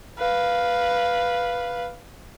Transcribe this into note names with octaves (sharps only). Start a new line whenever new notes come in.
B4 F5